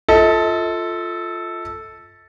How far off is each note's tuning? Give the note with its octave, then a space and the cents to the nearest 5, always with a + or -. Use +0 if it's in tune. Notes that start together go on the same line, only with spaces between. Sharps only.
F4 +0 A4 +0 D#5 +45